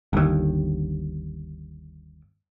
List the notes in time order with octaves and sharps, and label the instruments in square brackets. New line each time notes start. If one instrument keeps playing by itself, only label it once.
[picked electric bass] G1 D#2